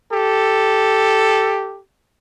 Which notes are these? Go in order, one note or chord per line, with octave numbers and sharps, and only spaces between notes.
G4 A4